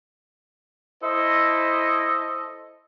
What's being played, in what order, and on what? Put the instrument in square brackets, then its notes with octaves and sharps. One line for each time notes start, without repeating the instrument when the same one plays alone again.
[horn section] E4 A4 C5 D#5